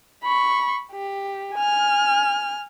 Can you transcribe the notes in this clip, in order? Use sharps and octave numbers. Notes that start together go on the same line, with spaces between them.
B5 C#6
G4
G#5 F6